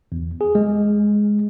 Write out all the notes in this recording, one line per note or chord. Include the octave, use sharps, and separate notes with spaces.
E2
G#4
G#3